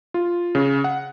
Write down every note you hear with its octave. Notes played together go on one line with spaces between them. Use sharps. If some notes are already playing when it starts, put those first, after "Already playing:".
F4
C#3
F#5